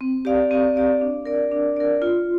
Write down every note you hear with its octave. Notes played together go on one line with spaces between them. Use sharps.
C4
G4 D5 F5
C4
G4 D5 F5
D4
A#4 D5
D4
A#4 D5
F4